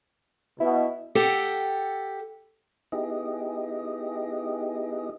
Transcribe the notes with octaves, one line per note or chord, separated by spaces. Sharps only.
B2 E4
G4 A4 F#5 G5
B3 D#4 E4 G4 G#4 D#5